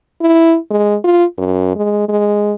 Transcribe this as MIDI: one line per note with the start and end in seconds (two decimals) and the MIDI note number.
0.21 0.57 64
0.71 0.96 56
1.04 1.25 65
1.38 1.73 42
1.76 2.07 56
2.09 2.54 56